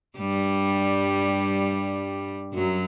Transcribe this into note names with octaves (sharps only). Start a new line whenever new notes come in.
G2 G3
F#2 F#3